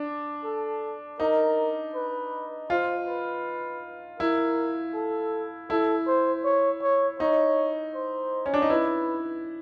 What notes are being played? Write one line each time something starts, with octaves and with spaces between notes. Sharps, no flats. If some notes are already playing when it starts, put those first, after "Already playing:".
Already playing: D4
A4
D#4 A#4
B4
F4 C5
B4
E4 A#4
A4
E4 A4
C5
C#5
C#5
D#4 C#5
C5
C#4
D4
D#4
E4 B4